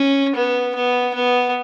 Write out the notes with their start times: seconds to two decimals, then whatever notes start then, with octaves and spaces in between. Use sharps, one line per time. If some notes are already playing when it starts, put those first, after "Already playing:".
Already playing: C#4
0.36 B3
0.75 B3
1.15 B3